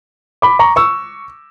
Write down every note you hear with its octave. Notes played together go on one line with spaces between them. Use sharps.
B5 D6
A#5 C#6
C#6 E6